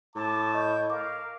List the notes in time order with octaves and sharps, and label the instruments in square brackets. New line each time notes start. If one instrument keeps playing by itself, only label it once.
[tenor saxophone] A2 [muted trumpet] A5 [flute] D6
[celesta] D#5 C#6 [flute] G6
[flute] A#4 [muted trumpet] F5 [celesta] D6